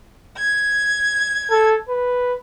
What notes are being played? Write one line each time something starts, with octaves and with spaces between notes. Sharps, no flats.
G#6
A4
B4